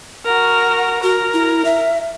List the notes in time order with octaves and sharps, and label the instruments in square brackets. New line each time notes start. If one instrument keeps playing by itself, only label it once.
[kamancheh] F#4 A#4
[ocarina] F#4 [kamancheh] A#4
[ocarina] E4
E5